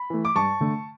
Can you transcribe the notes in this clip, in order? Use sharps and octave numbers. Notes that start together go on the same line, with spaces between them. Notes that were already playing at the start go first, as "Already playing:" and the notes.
Already playing: B5
E3 A3
D6
G2 A5 C#6
D3 A3